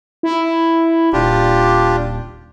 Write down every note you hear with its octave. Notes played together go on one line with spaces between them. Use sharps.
E4
D#1 D4 F4 G4